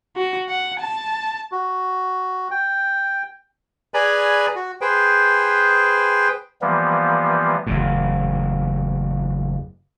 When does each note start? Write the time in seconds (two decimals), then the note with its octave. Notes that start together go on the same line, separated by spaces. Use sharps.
0.17 F#4
0.49 F#5
0.80 A5
1.52 F#4
2.51 G5
3.94 G#4 B4 D5 G#5 A#5 B5
4.55 F#4
4.81 G#4 B4 C5 G5
6.61 E3 F3 G3 A#3 B3
7.67 F#1 E2 A2